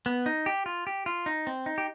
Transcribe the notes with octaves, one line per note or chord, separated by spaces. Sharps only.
B3
D#4
G4
F4
G4
F4
D#4
C4
D#4
G4